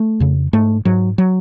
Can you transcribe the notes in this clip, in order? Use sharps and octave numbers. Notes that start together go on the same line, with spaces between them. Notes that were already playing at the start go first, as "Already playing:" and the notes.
Already playing: A3
F2 C#3
G#2 A3
G#2 F#3
F#3